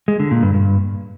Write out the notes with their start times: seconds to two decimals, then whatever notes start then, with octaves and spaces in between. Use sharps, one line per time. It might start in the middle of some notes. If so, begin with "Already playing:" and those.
0.08 G#3
0.20 D3
0.31 A#2
0.43 G2
0.54 G2